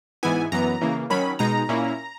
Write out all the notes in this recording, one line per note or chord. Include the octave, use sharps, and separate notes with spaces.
G#2 E3 B3 E4 G#5
F#2 E3 B3 A#5
C#3 E3 A#3
D#3 F#3 C#4 B5
B2 G#3 D#4 A#5
A#2 A#3 C#4 E4